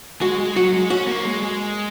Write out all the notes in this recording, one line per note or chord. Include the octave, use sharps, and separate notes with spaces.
G#3 F#4
G#3
F#3 F#4
G#3
C#4 F#4
A#3
G#3
G#3